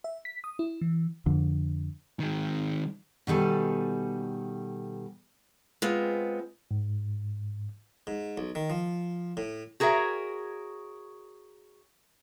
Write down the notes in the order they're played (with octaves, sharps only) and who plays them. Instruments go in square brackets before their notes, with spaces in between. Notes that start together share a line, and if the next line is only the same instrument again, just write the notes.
[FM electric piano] E5
B6
D#6
E4
E3
[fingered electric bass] F2 D3
[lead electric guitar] D#3 G#3
[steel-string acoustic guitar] B2 D#3 G3 A4 G#5
G#3 B3 C4 F4
[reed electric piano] G#2
[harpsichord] G#2
B1
D#3
F3
A2
[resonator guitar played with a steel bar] F#4 G#4 A#4 C#5 E5